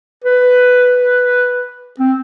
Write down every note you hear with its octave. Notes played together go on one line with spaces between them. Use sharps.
B4
C4